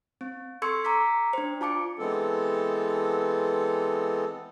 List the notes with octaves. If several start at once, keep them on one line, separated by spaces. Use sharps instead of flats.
C4
A4 C6 C#6 E6 G#6 C#7
A#5 D6 E6 B6
D4 C5
F4 A5 D6 C#7
E3 G#3 B3 C4 A4